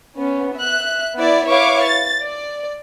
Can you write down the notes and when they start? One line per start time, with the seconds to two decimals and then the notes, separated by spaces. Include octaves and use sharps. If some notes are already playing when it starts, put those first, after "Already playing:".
0.17 B3 C#4
0.57 E5 F#6
1.16 B3 E4 D5
1.48 E4 B4 C#5 F5 C#6 D6
1.84 A6
2.23 D5